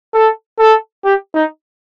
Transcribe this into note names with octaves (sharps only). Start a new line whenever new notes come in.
A4
A4
G4
D#4